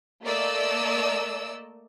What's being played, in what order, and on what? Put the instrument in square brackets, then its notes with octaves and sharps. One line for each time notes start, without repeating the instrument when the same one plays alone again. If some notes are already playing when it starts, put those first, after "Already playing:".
[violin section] A3 A#3 D5 D#5 E6